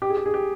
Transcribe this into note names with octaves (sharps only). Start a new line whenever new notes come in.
G4
G#4
G4
G#4
G4